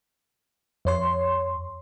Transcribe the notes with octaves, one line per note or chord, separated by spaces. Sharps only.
F2 C#5 C6